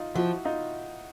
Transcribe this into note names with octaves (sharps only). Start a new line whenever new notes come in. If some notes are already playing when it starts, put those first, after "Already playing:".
Already playing: D#4 F4
F3 E4 F#4
D#4 F4